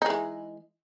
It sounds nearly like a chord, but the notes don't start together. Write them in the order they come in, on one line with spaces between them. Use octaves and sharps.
D#4 G#3 E3